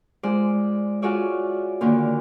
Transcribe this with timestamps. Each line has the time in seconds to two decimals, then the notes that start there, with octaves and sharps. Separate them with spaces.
0.23 G#3 F4 C5 D5
1.02 F4 F#4 G#4 C#5 D5 E5
1.81 A#2 D3 D#3 A#3